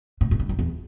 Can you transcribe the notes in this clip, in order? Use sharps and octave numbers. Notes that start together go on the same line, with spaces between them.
A2
G#2
G2
F#2
E2